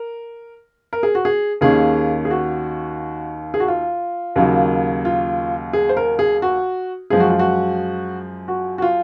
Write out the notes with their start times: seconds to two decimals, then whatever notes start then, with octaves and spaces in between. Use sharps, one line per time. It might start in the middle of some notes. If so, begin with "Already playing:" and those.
Already playing: A#4
0.93 A#4
1.03 G#4
1.15 F#4
1.25 G#4
1.61 D#2 D#3 A#3 C#4 G#4
2.25 G#4
2.31 F#4
3.54 G#4
3.60 F#4
3.68 F4
4.36 D#2 C#3 F#3 A#3
5.05 F4
5.73 G#4
5.89 C5
5.97 A#4
6.19 G#4
6.42 F#4
7.10 F#2 F3 G#3 G#4
7.20 F#4
7.29 F4
7.39 F#4
8.48 F#4
8.78 F#4
8.82 F4